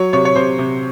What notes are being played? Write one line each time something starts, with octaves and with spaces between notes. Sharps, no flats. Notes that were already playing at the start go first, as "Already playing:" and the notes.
Already playing: F#3 C#5
C3 C#5
C#5
C3 C5
C3